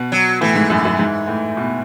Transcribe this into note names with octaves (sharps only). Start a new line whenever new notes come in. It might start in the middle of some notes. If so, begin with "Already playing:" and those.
Already playing: B2
F#3
A2 E3
G#2
F#2
F#2
G#2
A2
B2